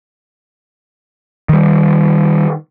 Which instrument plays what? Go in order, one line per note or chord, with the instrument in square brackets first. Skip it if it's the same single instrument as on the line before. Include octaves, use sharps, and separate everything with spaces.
[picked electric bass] D#3 G3